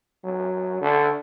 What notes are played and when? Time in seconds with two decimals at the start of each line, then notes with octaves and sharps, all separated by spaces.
0.24 F#3
0.81 D3